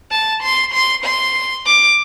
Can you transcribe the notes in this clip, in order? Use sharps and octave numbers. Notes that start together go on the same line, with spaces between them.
A5
C6
C6
C6
D6